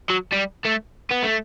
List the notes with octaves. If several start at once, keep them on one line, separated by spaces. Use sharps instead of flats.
F#3
G3
A3
B3
A3